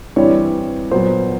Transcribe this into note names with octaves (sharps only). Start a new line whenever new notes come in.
G2 E3 G3 C4 E4 C#5
A#2 F#3 B3 C5